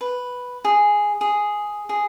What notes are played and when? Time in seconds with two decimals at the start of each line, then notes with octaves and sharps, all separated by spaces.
0.01 B4
0.65 G#4
1.21 G#4
1.89 G#4